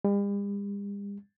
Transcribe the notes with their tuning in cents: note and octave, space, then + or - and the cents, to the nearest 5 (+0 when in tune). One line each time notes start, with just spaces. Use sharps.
G3 +45